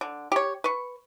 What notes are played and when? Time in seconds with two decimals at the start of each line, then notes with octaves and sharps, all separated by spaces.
0.01 D3
0.32 G4 C#5
0.64 B4 C#6